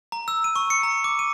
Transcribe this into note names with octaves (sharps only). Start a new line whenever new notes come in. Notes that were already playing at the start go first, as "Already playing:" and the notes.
A#5
E6
D#7
C#6
C#7
A#5
D6
D#7